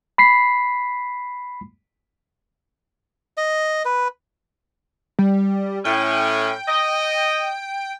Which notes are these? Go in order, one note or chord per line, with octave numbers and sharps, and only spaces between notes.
B5 B6 C7
D#5
B4
G3
A2 C#4 G5
D#5